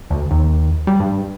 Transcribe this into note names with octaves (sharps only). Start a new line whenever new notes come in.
D2
D#2
G3
G2